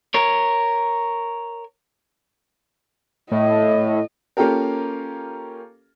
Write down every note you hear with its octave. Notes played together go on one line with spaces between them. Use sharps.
A#4 C#5
A2 D#5
A#3 C#4 F4 G4 A4 A#4